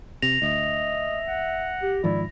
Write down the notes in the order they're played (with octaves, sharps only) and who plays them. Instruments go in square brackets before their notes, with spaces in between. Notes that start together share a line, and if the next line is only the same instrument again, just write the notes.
[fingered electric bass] C3 [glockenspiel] A#6 F7
[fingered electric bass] D2 [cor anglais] D#5 [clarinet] E5
[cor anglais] F#5
[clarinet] G4
[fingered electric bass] G#2 D#3 F3 [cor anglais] E4 [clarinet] D5